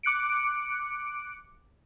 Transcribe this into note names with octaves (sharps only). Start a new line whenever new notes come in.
D6 F#6 C#7 D7